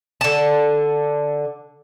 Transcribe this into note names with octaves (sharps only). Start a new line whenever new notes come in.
D3 A5